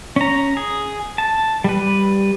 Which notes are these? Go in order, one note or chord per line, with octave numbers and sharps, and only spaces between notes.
C#4 A#5
G#4
A5
G3 B4